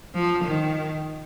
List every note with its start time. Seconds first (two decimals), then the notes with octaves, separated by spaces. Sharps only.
0.15 F3
0.44 D#3